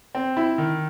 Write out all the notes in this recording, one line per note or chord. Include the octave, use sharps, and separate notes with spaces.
C4
E4
D#3